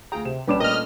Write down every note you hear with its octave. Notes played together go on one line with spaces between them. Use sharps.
D2 F4 G#4 G5 A#5
C3 E7
A#1 G3 C#4 D4 B4 D6 E7
A#2 A3 A#4 D#5 F6